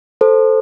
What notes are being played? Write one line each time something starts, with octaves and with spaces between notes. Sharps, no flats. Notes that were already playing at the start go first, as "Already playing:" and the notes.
A4 C5